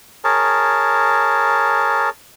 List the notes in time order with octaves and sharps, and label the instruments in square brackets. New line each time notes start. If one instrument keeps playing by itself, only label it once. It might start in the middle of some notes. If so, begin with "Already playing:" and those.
[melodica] G#4 A#4 C#5 A5